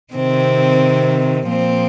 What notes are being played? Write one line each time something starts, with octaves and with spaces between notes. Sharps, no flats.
C3 D#3 C4
A#2 F3 C4